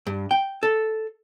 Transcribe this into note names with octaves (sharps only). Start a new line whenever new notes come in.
G2
G5
A4